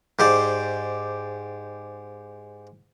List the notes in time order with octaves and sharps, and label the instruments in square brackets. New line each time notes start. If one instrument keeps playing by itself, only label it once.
[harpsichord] G#2 G4 C5 D5